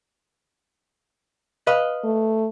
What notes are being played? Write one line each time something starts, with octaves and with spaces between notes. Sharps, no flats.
B4 D#5 F5
A3